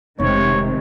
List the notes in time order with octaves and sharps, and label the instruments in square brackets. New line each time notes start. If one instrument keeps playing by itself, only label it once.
[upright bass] F1 [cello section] C3 D#3 G#3 [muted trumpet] C#5